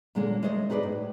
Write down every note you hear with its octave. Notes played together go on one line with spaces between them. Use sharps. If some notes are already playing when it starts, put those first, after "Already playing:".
A#2 D3 G#3 A#3 C#4 F4
G#3 A3 C5 C#5 D#5
D#4 G#4 B4 C#5 D5
A2